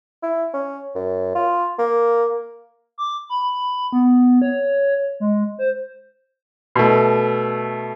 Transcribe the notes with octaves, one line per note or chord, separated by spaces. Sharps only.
E4
C#4
F#2
F4
A#3
D6
B5
B3
C#5
G#3
C5
B2 A3